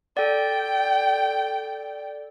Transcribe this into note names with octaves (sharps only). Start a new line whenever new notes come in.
A4 D5 G5